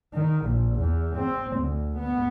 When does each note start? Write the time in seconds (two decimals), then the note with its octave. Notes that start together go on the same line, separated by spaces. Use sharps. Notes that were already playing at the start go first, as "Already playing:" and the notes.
0.14 D#3
0.46 A#1
0.76 E2
1.16 C4
1.57 D2
1.98 B3